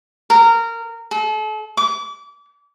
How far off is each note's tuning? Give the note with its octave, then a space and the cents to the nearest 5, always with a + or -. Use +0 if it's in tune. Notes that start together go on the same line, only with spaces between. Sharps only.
A#4 -20
A4 -40
D6 -30